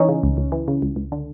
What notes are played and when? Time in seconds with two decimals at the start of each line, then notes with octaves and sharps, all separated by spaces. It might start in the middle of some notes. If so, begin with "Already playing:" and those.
Already playing: E3 C#4 D#4
0.09 C#3
0.23 C#2
0.37 C#2
0.52 E3
0.68 C#3
0.82 C#2
0.96 C#2
1.12 D3